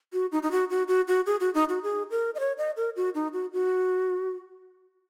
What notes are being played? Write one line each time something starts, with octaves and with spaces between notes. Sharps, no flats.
F#4
D#4
D#4
F#4
F#4
F#4
F#4
G#4
F#4
D#4
F#4
G#4
A#4
D#5
C#5
D#5
A#4
F#4
D#4
F#4
F#4